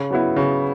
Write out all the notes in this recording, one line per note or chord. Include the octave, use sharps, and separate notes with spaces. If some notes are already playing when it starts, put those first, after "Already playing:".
Already playing: C#3
F#3 B3 E4
C#3